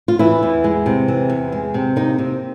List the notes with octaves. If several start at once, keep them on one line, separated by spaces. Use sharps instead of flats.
F4
E3 E4
E2
G#3
C3
E3
E2
G#3
C3
A#3 D#4
C3